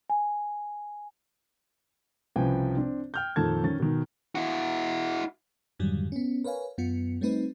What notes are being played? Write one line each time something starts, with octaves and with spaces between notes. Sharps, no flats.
G#5
C2 C#3 F3 B4 G5 G#5
C4 D4
G5 F6 G6
F2 A#2 D#3 A4 A5 G#6
D#3 C#4 A6
B2 D#3
E4 F#4
F2 G#2 D3 D#3 F#3 G3
B3 C#4
A#4 B4 C#5 F5 G#5
F#2 B3 F4 C#7
G3 A3 C4 D#4 B4